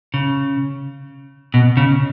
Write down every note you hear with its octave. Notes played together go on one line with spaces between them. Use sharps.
C#3
B2
C#3